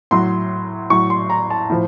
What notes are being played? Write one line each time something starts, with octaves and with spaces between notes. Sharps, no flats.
A2 F#3 C6
A2 F#3 C#6
C6
A#5
A5
A2 F3